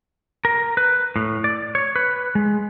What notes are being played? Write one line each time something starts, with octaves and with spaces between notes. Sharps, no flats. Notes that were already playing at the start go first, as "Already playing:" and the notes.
A#4
B4
A2
D5
C#5
B4
G#3